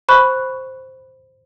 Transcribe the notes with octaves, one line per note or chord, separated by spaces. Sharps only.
C5 B5 C#6 F#6